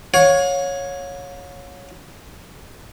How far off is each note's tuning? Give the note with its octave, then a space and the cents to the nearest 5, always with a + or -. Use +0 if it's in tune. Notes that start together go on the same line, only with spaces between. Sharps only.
C#5 +0 F5 +45